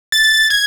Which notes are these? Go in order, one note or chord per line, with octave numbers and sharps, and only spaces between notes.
A6
G#6